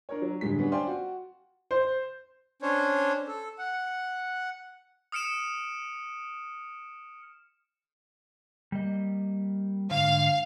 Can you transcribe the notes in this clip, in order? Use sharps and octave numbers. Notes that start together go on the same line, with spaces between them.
D4 A#4 C#5
F#3
D1 G2 G3 G#3 B6
G3 B3 C#4 D4
C5 D5 F5 G5 G#5 C6
F#4
C5
C#4 D4 C5 C#5
A4
F#5
D#6 F6 C#7 D7 E7
G3 A#3 D#5
G#2 D3 F5